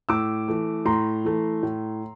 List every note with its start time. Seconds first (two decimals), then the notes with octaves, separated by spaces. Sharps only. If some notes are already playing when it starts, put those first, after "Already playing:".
0.09 A2 D6 E6
0.48 E3 A3
0.85 A2 A#5 C6
1.25 E3 A3
1.63 A2